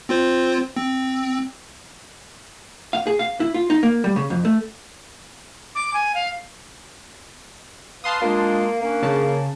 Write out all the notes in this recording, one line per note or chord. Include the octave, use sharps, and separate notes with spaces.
C4 F4 C5
C4
F5
G#4
F5
E4
F4
D#4
A#3
G3
C#3
F2
A3
D6
G#5
F5
B4 F5 A5 C6 D#6
G#3 A#3 D4 F4
A#3 C#4 D4
C#3 A5